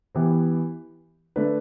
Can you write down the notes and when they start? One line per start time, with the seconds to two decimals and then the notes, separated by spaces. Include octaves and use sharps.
0.15 E3 B3 G4
1.36 D3 A3 D4 B4